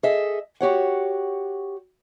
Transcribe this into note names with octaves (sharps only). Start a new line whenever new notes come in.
G#4 A4 D#5 E5
F#4 G4 C#5 F#5